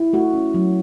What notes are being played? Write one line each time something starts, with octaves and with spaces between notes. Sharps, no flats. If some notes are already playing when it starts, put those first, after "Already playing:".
Already playing: E4
A3 F#4
C#4
F#3